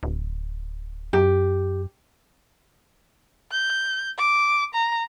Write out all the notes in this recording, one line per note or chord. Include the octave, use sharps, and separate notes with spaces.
D1
F#2 G4
G6
D6
A#5